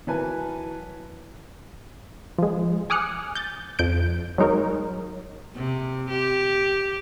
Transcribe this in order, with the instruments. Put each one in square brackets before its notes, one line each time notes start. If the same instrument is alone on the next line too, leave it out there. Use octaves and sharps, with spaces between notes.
[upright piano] E3 F#3 A#4 B4 G#5 A5
[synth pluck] F3 G#3
G#5 D6 D#6 F6 F#6 C#7
G6 A6
F2 G6 D7
F#3 G#3 D#4 A#4 C#5
[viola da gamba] C3
G4